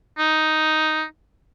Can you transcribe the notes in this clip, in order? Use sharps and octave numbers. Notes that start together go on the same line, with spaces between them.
D#4